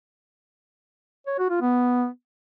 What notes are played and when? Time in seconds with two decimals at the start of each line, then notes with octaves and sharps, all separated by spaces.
1.27 C#5
1.38 F#4
1.50 F4
1.61 B3